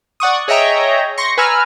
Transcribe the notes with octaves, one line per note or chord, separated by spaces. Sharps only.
D5 F#5 C#6 D#6
G#4 C#5 D#5 E5 G5 A#5
C6 C#6 A#6 C#7
B4 G#5 A#5 E6 F6